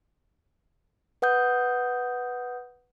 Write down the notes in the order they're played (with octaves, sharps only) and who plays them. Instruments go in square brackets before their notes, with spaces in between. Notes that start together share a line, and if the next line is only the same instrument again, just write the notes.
[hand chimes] B4 F#5 D#6 G6